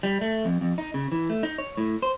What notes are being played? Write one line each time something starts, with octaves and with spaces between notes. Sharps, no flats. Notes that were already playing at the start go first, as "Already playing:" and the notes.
G3
A3
F2
F2
D#4
C#3
E3
A3
D#4
C#5
A2
C5